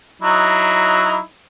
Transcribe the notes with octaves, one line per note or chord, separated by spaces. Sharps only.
F#3 D#4 E4